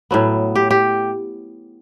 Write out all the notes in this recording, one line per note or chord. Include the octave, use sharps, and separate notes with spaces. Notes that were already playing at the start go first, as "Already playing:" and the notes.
A2 F#3 B3
G4
G4